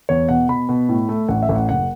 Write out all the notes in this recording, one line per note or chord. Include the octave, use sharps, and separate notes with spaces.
E2 C#5
B2 F#5
B2 B5
B2
A2
A3
A1 F#5
E5
A1
F#5
F#1 F#5